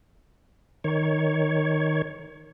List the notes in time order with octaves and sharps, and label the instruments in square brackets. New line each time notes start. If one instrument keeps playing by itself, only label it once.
[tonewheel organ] D#3 C#5